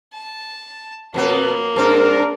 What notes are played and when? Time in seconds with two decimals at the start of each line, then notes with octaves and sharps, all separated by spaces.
0.14 A5
1.14 F2 B2 A#3 B3
1.76 G2 C4 D4 A#4